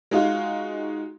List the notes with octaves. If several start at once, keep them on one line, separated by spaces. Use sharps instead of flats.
G#3 D#4 F4 F#4